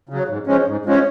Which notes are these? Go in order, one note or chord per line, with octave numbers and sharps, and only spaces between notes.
C#3 F#3
G#2
F3 G#3 C#4
G#2
F3 G#3 C#4